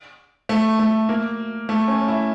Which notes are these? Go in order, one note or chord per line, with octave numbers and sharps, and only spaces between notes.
A3
A3
A#3
A3
C#4
E4